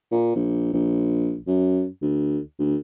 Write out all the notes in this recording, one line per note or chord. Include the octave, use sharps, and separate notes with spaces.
A#2
A#1
A#1
F#2
D2
D2